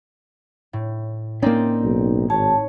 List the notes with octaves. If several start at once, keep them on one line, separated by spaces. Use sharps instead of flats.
A2
A#3 C4 C#4 D#4 D5
B1
G#1 C#5 A5